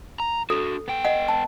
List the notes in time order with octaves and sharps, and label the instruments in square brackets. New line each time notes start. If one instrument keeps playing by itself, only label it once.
[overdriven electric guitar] A#5
[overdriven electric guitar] D4 F#4 [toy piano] A4
[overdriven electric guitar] B3 G5
[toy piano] D#5 F#5
A5